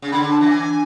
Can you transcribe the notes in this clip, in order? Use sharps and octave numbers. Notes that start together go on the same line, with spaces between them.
C#3
D3 B5
A5
E3
G#5